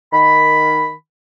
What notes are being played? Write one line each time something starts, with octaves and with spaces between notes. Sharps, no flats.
D#3 B5